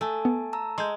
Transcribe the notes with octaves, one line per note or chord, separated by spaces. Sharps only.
A3 A4 G#5 A5
B3
A5 A#5 E6
G#3 C6 G6